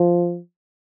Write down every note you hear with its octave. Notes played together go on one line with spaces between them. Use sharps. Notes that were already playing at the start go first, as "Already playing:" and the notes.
Already playing: F3